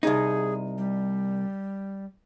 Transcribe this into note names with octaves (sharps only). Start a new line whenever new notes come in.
C2 D#4 G#4
G3